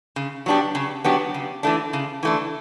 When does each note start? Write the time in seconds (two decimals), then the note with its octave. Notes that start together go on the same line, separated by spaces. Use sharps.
0.16 C#3
0.46 F#3 B3 D4 G4
0.75 C#3
1.04 F#3 B3 D4 G4
1.34 C#3
1.63 E3 A3 D4
1.93 C#3
2.23 E3 A3 D4